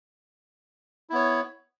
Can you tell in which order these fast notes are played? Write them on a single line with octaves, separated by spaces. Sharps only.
E4 B3 C#5